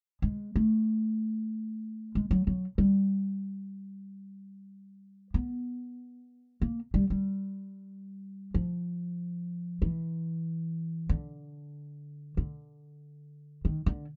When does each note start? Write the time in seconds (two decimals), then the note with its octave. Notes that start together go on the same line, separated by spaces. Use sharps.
0.22 G#3
0.56 A3
2.15 G#3
2.31 F#3
2.47 F#3
2.78 G3
5.34 B3
6.61 A#3
6.94 G3
7.10 G3
8.54 F3
9.82 E3
11.09 D3
12.37 D3
13.65 D#3
13.86 D3